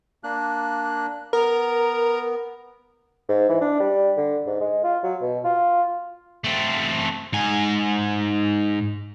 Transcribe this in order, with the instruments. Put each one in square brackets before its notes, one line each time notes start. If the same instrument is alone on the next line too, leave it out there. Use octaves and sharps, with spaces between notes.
[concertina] A#3 D4 F#6
[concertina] B3 [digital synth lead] A#4
[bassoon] G#2
E3
D4
G3
D3
G#2
G#3
F4
F#3
B2
F4
[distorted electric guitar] A3 C4
G#2 G#5